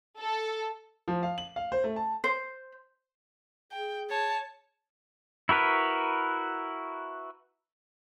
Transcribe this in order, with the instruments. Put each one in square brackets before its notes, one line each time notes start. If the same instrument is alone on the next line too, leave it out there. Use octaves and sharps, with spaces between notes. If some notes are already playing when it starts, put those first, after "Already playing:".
[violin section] A4
[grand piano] F3
F5
F#7
F5
C5
A3
A5
[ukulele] C5
[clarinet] G#4 [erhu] G5
[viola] C#5 [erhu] A5
[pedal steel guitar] E4 F#4 A#4 B4